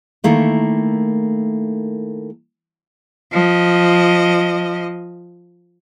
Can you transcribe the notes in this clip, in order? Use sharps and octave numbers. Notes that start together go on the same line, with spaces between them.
D#3 A3 A#3 E4
F3 D#5